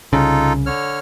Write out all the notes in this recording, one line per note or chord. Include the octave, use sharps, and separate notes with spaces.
C2 C#3 D#4 F4 A4
D3 C#5 F6